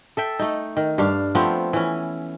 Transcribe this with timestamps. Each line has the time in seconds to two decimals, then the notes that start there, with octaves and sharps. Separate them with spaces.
0.17 A4 E5 G5
0.39 A3 D#4
0.77 D#3
0.98 G2 D4 F5
1.35 F3 A3 B3 C4
1.73 E3 C#4